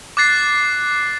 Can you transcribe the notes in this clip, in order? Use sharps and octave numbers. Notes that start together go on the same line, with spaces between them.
D6 F#6 A6 C7